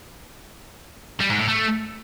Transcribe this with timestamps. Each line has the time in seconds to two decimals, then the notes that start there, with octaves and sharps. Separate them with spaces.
1.21 G3
1.30 G#2
1.39 A2
1.48 A3